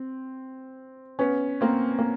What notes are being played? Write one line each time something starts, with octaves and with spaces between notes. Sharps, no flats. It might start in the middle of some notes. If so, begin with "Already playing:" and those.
Already playing: C4
B3 C#4
A#3 C4
A#3